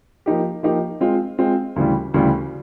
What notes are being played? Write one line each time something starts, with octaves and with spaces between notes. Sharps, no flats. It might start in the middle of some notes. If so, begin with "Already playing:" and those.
F3 A#3 D#4 G4
F3 A#3 D#4 G4
G#3 C4 F4
G#3 C4 F4
D2 C#3 E3 G3
D2 C#3 E3 G3